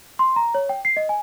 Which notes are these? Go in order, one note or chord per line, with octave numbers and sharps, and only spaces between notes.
C6
A#5
C#5
G5
C7
D#5
G#5